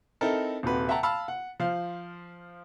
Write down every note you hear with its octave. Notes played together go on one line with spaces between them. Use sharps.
C4 D#4 E4 A4 A#4
D#1 C3 F#4 B4
E5 F#5 G5 A5 A#5
F5 A5 B5 E6 F6
F#5
F3 C5 F5